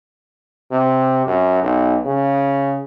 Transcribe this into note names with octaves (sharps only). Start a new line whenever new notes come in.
C3
F#2
B1
C#3